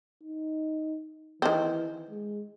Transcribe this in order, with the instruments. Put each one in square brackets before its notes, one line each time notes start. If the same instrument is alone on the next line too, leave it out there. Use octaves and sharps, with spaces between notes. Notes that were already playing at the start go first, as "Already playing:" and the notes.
[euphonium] D#4
[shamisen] D#3 C4 [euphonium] E3
[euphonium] G#3